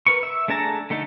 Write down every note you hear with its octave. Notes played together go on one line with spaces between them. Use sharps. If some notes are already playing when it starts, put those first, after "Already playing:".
A#4 B4 C#6
E5
A3 D4 G#4 A5 A#5
D3 A3 D#4 A4